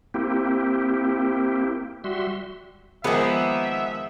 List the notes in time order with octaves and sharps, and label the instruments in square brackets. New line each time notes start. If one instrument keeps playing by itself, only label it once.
[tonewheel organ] A#3 C4 E4 G4
G3 F#4 E5 C6
[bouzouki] D#3 A#3 B3 [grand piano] F3 G#3 G#4 [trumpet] E5